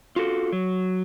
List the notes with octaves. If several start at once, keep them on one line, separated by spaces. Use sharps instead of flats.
F4 F#4 A4
F#3